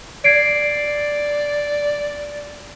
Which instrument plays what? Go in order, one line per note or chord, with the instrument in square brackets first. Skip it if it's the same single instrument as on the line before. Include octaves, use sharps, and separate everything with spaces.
[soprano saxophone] D5 [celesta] G#6 C7 D7